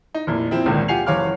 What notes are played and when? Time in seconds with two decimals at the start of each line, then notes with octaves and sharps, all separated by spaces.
0.14 D#4
0.27 F1 A#2 E4
0.51 F3 C4 E4
0.66 G#1 C#2 A#2 D3 D#3
0.88 F4 G4 F#5 G#5 C7 F7
1.06 F#1 E3 C#5 F5 D6 F6